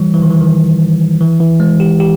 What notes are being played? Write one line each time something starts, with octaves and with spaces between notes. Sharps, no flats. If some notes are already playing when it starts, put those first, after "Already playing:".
Already playing: E3 G3
E3
D#3
E3
D#3
E3
E3
G#3
G4
G4